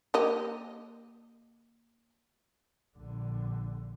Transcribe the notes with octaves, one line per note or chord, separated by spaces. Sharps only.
A#3 G4 D#5
A#1 D3